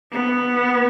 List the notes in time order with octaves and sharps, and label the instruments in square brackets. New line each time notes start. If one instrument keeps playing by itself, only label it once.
[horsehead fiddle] B3